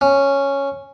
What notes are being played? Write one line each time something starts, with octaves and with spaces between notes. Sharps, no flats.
C#4